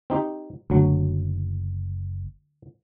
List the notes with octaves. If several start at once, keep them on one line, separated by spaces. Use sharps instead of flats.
C4 D#4 G4
F#1 D2 F#3